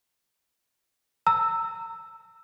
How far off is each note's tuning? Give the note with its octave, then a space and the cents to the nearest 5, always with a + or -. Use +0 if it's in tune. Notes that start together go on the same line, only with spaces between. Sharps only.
A#5 -35 E6 +5